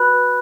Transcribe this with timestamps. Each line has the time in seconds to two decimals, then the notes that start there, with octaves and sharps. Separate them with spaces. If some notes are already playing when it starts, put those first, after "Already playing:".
Already playing: F#4 B4 B5 F#6
0.12 B4